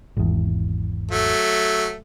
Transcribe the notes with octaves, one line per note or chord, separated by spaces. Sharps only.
G#1 E2
F#3 A3